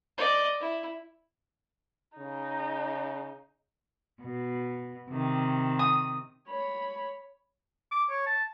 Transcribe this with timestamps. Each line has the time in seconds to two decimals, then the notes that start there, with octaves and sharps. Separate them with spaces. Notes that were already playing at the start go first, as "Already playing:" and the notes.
0.18 D5 D#5
0.61 E4
2.18 C#3 D#4
4.22 B2
5.10 C3 D#3
5.79 D#6
6.49 C#5 B5
7.91 D6
8.10 C#5
8.26 A5